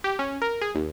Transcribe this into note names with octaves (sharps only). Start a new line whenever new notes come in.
G4
C#4
A#4
G#4
D#2